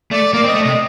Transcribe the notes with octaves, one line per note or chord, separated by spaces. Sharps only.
A3 D5
A#3 D5
C4
D#5
A3
C3 D#5